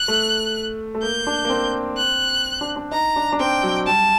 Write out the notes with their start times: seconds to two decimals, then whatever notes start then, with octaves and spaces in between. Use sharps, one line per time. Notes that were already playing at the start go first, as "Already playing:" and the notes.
Already playing: F#6
0.08 A3
0.95 A3
1.02 A#3 G6
1.27 D4
1.45 A#3
1.50 C4
1.97 F#6
2.61 D4
2.76 D4
2.92 D#4 A#5
3.16 D4
3.32 D4
3.40 C4 G5
3.63 F#3
3.86 G3 A5